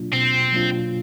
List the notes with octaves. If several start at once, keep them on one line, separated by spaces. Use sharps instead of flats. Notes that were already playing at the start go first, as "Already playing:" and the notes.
Already playing: B2 F#3 A#3 D4 F4
B2 C4
F#3 A#3 D4 F4